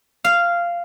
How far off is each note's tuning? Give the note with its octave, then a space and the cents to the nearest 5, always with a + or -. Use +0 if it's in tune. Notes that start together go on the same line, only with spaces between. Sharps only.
F5 -10